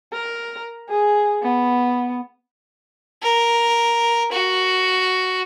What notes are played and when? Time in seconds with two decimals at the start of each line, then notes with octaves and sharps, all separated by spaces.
0.13 A#4
0.89 G#4
1.42 B3
3.23 A#4
4.32 F#4